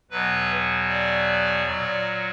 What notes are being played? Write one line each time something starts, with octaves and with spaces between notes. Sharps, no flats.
E2 B2 F#3 B4
D5
A#2 F#3 D5